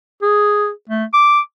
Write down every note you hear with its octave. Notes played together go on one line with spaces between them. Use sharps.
G#4
A3
D6